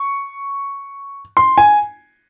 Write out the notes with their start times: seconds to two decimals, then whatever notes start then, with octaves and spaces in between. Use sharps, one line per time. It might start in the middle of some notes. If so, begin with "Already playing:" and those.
Already playing: C#6
1.37 C6
1.58 G#5